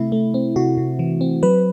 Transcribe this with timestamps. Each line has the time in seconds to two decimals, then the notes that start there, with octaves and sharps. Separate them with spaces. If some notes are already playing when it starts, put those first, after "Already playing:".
Already playing: C3 A3 E4
0.12 A3
0.34 C4
0.56 C3 F#4
0.78 C3
0.99 E3
1.21 C4
1.43 F#3 B4